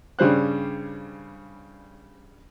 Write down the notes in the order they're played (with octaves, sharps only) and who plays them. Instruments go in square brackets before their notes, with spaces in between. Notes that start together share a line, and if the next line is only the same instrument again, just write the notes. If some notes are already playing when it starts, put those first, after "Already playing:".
[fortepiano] G2 C#3 G3 C5 F#6